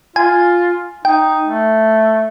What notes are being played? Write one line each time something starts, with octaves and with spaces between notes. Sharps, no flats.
F4 G#5
D#4 G5
A3